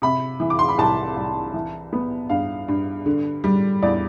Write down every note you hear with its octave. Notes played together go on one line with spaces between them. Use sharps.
C3 B5
E3
D6
C6
B5
C2 A5
C2
E3
B3
G2 F5
G2
D3
G3
E2 D5